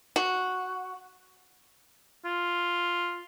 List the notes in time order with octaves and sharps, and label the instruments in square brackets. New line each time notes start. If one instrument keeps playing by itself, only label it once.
[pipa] F#4
[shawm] F4